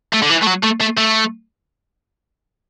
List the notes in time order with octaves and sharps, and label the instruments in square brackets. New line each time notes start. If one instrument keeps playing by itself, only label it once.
[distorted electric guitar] A3
D3
E3
A3
F#3
A3
A3
A3